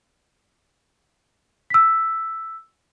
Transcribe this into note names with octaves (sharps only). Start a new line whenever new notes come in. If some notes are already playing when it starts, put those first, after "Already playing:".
E6 B6